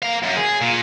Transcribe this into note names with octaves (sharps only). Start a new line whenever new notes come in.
A#3 F5
F#2
G#4
A#2